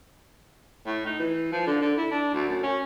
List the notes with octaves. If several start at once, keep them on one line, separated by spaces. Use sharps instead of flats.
A2
D#4
E3
F3
D3
D3
E4
D4
D2
F#2
C#4